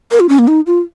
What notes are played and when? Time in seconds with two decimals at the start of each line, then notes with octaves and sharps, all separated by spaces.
0.11 A#4
0.20 F4
0.29 C#4
0.39 A#3
0.48 D#4
0.67 F4